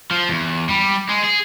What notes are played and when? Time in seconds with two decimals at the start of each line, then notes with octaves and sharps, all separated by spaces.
0.11 F3
0.29 E2
0.69 G3
1.09 G#3
1.24 G#4